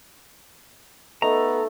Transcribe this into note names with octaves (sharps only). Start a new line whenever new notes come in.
A3 B3 D#4 A4 A#5